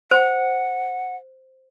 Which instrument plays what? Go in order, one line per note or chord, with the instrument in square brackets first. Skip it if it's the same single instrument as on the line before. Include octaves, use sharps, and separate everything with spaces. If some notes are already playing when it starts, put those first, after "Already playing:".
[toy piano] C5 [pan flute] F#5